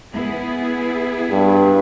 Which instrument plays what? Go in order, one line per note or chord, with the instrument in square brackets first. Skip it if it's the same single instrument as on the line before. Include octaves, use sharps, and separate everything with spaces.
[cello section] B3 E4 G#4
[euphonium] G2